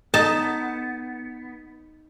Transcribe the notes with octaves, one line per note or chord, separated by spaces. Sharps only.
B3 D#4 A4 D#5 A5